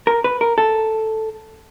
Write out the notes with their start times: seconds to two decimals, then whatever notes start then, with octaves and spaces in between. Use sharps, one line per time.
0.07 A#4
0.24 B4
0.41 A#4
0.58 A4